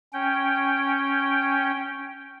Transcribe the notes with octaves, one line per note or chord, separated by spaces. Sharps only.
C#4 G5